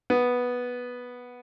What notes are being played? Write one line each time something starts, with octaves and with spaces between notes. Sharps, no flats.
B3